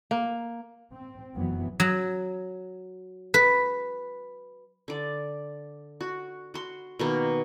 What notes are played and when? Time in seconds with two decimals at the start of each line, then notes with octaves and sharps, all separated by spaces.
0.11 A#3
0.92 C4
1.35 F1 F#2 E3 F#3 B3
1.80 F#3
3.34 B4
4.88 D3 D5
6.01 F#4
6.54 F#4 C6
6.99 B2 D#3 A#3